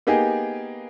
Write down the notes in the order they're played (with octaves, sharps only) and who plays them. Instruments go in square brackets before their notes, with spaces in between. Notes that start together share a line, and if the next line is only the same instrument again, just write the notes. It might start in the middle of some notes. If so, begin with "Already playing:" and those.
[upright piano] A#3 B3 D#4 G4 G#4